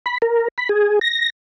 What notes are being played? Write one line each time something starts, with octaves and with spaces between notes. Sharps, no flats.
B5
A#4
B5
G#4
A#6